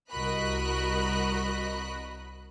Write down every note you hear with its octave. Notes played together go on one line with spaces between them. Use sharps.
C2 F#4 A#4 D#5 B5 F#6